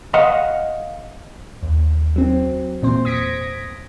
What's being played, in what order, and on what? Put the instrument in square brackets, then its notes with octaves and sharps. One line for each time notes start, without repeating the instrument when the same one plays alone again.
[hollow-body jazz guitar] D#5 F5 F#5
[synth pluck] D#2
F#3 C4
E2 A#2 C4 C5
D#6 G#6 A#6 B6 C#7 D7